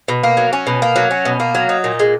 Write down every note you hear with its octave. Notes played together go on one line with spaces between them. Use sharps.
B2
A#3
F#3
C#4
B2
A#3
F#3
C#4
B2
A#3
F#3
D#4
A#2
G#3